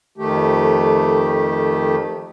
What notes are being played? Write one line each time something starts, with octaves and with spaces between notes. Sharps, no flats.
F2 D#3 A3 G4